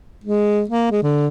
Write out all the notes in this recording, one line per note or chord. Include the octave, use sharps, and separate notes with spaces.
G#3
A#3
G#3
D3